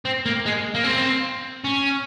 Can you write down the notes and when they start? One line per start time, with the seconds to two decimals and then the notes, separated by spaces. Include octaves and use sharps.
0.05 C4
0.26 A#3
0.46 G#3
0.75 A#3
0.84 C4
1.65 C#4